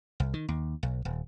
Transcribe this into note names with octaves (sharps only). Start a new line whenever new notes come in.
C2
D#3
D#2
B1
D#1